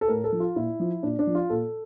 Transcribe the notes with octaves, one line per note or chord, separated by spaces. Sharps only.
A4
A2 A#4
A4
F3
F4
A#2 E4
F3
A#2 D4
D4
F3
F4
A#2 A4